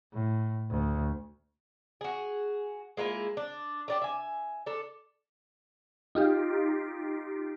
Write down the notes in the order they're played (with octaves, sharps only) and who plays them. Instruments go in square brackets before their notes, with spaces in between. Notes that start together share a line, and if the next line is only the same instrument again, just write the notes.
[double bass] A2
D2
[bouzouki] F#4 G#4
G#3 A#3 E4 F4
D4
A3 D4 G4
E5 G#5
D4 A4
[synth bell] D#4 F4 G4